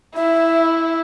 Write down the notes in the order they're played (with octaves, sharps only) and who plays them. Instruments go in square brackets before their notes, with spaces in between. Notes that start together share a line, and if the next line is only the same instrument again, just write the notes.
[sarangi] E4 [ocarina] E5